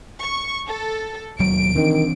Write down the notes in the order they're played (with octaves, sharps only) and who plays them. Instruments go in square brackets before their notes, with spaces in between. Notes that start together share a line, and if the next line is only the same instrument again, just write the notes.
[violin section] C#6
A4
[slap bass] E1 D#2 F#3 [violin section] D7
[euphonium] D#3 [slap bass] E3 C4 D4